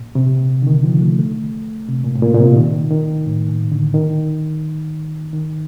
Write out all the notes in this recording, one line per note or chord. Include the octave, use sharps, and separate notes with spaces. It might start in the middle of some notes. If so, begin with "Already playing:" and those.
Already playing: A#2
C3
D3
D#3
F3
A3
A3
C3
A#2
A2
A#2
A#2
C3
D#3
D#3
A2
A#2
D3
D#3
D#3